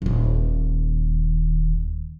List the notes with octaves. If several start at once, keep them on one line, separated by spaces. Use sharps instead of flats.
D#1 D#2